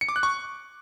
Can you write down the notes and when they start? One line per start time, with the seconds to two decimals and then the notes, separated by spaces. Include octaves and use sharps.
0.01 C#7
0.09 D6
0.16 F#6
0.23 C#6